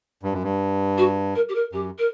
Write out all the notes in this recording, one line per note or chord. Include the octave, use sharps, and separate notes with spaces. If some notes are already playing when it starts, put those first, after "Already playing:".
G2
F#2
G2
F#4
A#4
G4
A#4
F#2 G4
A#4